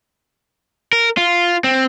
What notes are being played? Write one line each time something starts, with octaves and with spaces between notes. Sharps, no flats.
A#4
F4
C4